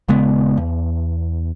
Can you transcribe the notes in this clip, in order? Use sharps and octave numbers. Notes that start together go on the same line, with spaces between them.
D#1 C#3 G#3 B3
E2